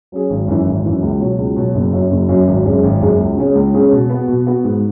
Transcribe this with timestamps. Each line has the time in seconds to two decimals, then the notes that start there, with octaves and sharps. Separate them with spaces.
0.12 F#3 C#4 G#4
0.30 G#1
0.48 F#2 E3
0.66 G#1
0.85 F#2 E3
1.02 C#2
1.20 B2 F#3
1.38 C#2
1.56 B2 F#3
1.75 F#1
1.93 F#2 F#3
2.11 F#1
2.28 F#2 F#3
2.48 G#1
2.65 F#2 C#3 G#3
2.83 G#1
3.01 F#2 C#3 G#3
3.19 C#2
3.37 C#3 G#3 C#4
3.55 C#2
3.74 C#3 G#3 C#4
3.92 B2
4.10 B3 F#4
4.28 B2
4.46 B3 F#4
4.64 G#2